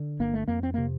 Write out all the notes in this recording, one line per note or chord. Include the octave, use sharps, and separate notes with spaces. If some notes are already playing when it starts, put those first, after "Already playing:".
Already playing: D3
G1 A#3
A3
F2 A#3
C4
C3 A#3